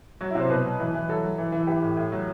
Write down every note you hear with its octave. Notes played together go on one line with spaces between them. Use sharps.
F#3 F#4
E4
C3
C5
B2 B4
F#3
E3
E3
F#3 A4
F#3
E3
E3
E3 G4
A2
A2
F#3